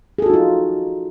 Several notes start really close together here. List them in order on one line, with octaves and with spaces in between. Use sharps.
G#4 A4 F#4 D#4 F4